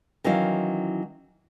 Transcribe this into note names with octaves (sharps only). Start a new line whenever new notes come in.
D#3 E3 F#3 C#4 E4 F5